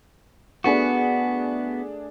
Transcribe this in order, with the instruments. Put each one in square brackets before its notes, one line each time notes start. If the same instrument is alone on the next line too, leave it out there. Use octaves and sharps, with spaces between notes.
[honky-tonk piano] A3 D4 G#4 [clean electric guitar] B3 F#4